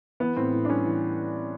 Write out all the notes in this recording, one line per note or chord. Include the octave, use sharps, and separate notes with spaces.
E3 B3
A2 C4
A2
D4
G3 C#4
E3